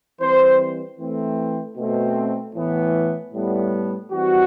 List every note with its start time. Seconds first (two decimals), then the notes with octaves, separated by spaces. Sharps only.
0.21 E3 G3 C4 C5
0.99 E3 A3 C4
1.77 B2 A3 C4
2.55 A2 E3 B3
3.33 A2 G3 B3
4.12 E3 G3 C4 F#4